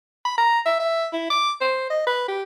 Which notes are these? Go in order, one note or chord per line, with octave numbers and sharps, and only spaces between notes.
B5
A#5
E5
E5
E4
D6
C5
D#5
B4
G4